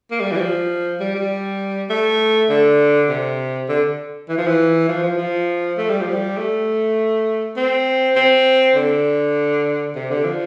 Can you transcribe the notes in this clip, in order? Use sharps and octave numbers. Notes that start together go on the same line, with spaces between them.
A#3
G3
E3
G3
F3
G3
G3
A3
D3
C3
D3
E3
F3
E3
F3
F3
F3
A3
G3
F3
G3
A3
C4
C4
D3
C3
D3
F3